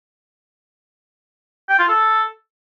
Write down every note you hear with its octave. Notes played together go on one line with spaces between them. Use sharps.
G5
F4
A4